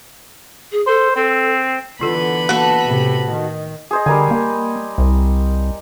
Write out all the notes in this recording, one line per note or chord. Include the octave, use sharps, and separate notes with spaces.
G#4
A4 C5
C4 A4
D3 E3 B3 F4 A4 B5
A#3 F#4 A4 B4
A2 C3
D#3
G#4 C5 D#5
D3 G3 A#4 G#5
A#3
C2